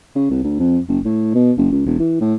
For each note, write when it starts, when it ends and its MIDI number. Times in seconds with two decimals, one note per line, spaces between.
0.15 0.25 49
0.30 0.43 36
0.44 0.56 38
0.59 0.79 41
0.88 0.99 30
1.05 1.32 45
1.34 1.52 47
1.57 1.68 30
1.72 1.84 37
1.86 1.99 28
1.99 2.20 52
2.20 2.35 45